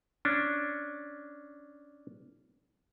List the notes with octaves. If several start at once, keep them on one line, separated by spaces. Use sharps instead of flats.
C#4 D4